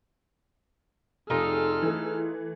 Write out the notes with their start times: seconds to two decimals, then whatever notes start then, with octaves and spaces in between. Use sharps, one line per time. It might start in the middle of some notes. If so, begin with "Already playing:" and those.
1.30 F1 D#4 F4 G#4 A4 F6
1.82 E3 A3